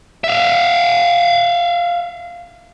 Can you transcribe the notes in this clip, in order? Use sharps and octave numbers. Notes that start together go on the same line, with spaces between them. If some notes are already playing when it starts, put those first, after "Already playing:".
E5 F5